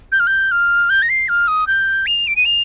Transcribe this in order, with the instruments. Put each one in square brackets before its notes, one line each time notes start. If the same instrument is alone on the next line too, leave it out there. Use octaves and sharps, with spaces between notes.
[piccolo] G6
F6
G6
F6
G6
A#6
C7
F6
D#6
G6
F7
D7
D#7
F7